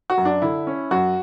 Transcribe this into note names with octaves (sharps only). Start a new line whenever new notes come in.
F#4
F#2
D4
D3 E4
C#4
F#2 F#4